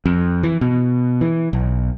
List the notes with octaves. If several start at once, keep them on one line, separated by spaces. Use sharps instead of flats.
F2
E3
B2
E3
B1